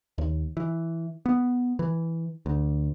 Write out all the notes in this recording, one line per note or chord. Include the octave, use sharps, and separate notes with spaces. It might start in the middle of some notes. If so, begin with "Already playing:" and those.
D#2
E3
B3
E3
D2